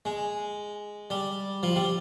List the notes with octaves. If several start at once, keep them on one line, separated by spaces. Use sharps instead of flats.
G#3
G3
F3
G3